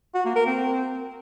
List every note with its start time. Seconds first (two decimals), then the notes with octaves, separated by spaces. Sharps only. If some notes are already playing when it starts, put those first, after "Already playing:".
0.15 F#4
0.25 A#3
0.36 A#4
0.47 C4